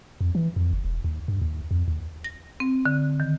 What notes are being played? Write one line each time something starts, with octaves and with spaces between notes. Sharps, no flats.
F2
E3
F2
F#1
E1
D#2
G2
D#2
F2
D#2
A#6
C4
D3
D#3